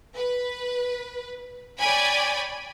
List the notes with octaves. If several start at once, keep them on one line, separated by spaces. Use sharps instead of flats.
B4
C#5 D5 G5 G#5 B5